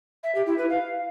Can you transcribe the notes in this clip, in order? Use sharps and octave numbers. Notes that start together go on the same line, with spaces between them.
E5
G4
E4
B4
F5